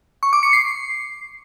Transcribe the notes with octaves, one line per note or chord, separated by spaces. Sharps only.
C#6
D6
C#7
C7